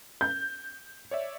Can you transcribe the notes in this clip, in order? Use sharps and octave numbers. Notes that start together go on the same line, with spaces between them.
G6
C#5 D5 E5